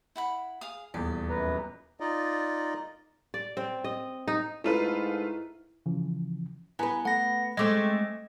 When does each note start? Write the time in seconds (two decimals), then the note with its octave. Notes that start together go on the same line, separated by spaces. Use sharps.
0.16 E4 F#5 B5
0.61 G#4 F5 D#6
0.94 D#1 E2 D5
1.29 F#2 B4 A#5
2.00 D#4 F4 D5 D#5
3.34 D5
3.57 C4
3.84 D#5
4.28 D#4
4.64 G#2 A3 E4 F4 B4
5.86 C#3 E3 F3
6.79 B3 E4 B4 G#5 A#5
7.05 A3 F#5 A#6
7.57 G#3 A3 C4 D#5 D6 G#6